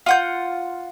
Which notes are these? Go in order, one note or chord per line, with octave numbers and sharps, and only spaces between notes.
F4 F#5 G6